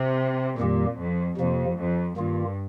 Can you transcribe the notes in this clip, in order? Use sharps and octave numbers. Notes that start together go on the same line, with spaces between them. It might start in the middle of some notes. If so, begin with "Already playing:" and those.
Already playing: C3
F2 A#2 D#3 G3 A#3 G4
F2
F2 C3 F3 A#3
F2
G2 D#3 A#3 F4